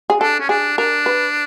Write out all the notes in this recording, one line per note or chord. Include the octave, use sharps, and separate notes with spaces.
G#4
D4 A4
C#4
D4 G#4
D4 A#4
B4